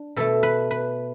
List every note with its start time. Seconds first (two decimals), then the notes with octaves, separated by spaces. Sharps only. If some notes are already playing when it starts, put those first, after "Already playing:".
Already playing: D4
0.16 B2 A3 A4
0.43 B4
0.71 B4